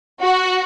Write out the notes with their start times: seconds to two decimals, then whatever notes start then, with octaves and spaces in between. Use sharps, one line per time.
0.21 F#4